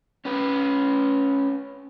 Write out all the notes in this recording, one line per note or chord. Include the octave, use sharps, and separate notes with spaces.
C#4 B4